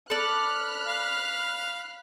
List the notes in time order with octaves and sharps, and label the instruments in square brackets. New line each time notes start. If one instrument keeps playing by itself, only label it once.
[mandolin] A4 D5 [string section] B5 F6 F#6
[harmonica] F5